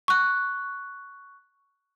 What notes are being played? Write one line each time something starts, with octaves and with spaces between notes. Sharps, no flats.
C#6 F#6